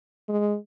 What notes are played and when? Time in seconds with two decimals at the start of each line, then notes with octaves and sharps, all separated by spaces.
0.29 G#3